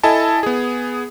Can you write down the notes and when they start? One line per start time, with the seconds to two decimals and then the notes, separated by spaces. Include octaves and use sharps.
0.03 E4 A4 D#5 G#5 A5
0.43 B3 G#4